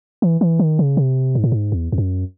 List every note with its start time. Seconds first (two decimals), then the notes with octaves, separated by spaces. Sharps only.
0.22 E3
0.41 E3
0.59 D#3
0.79 C#3
0.97 C3
1.35 G#2
1.44 A2
1.52 G#2
1.72 E2
1.92 E2
1.98 F#2